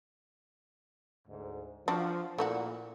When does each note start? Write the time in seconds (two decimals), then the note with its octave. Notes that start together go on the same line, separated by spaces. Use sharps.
1.28 D2 G#2
1.88 F3 D4 F#4
2.38 A#2 A3 E4 F#4